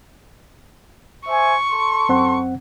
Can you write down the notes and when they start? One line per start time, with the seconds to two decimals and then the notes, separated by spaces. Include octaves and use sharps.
1.28 C5 E5 G#5 C#6
1.71 A4 C6
2.09 F#2 C4 F#5